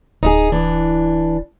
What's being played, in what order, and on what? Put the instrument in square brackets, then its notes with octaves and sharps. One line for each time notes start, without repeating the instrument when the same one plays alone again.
[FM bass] D1 [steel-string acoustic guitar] D#4 E4 G#4
[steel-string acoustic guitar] E3 D4